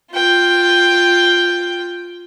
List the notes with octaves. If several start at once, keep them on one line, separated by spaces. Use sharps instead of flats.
F4 G5